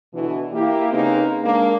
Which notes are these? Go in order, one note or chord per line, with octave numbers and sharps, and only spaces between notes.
B2 D3 E3
A#3 E4 G4
C#3 A#3 C4 D#4 G#4 B4
G#3 A#3 D4